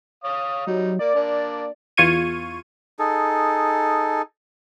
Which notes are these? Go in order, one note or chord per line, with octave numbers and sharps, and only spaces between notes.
C#5 F5 D#6
F#3 G3 D#4
A#3 D5
A#3 D4
E2 F4 C#6 G#6 D#7
D#4 G#4 A4